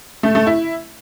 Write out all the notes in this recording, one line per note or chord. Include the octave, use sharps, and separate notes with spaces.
A3
A3
E4